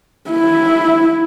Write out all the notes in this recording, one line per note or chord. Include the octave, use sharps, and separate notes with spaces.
E4